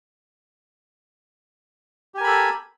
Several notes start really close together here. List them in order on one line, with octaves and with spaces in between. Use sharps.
G4 G#5 A#4 B5 A4